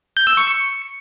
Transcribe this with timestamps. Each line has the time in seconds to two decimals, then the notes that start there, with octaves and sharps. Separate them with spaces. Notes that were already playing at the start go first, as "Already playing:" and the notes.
0.17 G6
0.27 E6
0.37 C#6
0.48 C#7